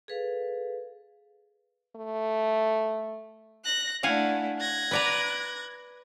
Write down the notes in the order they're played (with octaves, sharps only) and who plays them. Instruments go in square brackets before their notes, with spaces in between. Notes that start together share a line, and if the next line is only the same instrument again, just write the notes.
[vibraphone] G#4 A4 B4 F5
[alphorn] A3
[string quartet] F#6 A#6
[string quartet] A3 D4 E4 [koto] F5 F#5 G#5
[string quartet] F#6 G#6 A#6
[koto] B4 D5 A#5